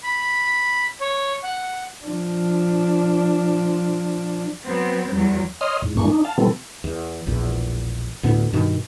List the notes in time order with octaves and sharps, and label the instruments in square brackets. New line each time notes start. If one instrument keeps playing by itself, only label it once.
[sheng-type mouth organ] B5
C#5
F#5
[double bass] F3 D4
[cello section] F#3 B3 C4
E2 F#3 G3
[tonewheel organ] C#5 D#5 C6 D#6 F6
E2 G#2
G2 E3 G#3 A#3 D4 C#6
D4 D#4
F5 A5
B2 E3 G3 B3 C4 A4
[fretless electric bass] E2
E1 A#1 E2
D2 A2 B3 D4
G2 B2 D#3